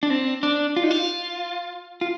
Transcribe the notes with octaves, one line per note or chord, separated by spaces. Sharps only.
D4
C4
D4
F4
D#4
F4
F4